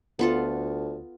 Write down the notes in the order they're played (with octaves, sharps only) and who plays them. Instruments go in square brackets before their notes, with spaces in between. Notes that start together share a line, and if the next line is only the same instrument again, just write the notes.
[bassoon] D2 [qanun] B3 F4 A4